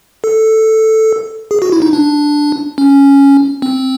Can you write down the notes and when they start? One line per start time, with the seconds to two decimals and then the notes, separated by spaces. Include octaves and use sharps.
0.24 A4
1.51 G#4
1.62 F#4
1.72 E4
1.82 D#4
1.93 D4
2.78 C#4
3.62 C4